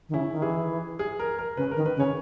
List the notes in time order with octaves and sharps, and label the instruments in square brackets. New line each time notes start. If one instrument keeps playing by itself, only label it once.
[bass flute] D#3
[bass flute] C#3 [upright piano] E4
[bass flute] D#3
[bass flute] E3 [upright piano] G#4
[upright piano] G#4
A#4
A#4
[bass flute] C#3 [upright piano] B4
[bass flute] D#3 [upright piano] A#4
[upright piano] B4
[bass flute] C#3
[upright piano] C#5